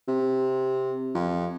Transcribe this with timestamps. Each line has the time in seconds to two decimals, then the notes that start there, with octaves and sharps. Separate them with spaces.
0.08 C3
1.14 F2